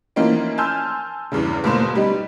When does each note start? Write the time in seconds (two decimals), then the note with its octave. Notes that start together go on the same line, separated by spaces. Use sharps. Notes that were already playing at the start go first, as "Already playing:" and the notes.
0.16 E3 F3 A#3 C4 C#4 D#4
0.58 G#5 A5 C6 E6 F6 G6
1.32 E2 G2 C#3
1.64 G1 G#2 B2 A#3 C5 E7
1.95 G3 B3 D#4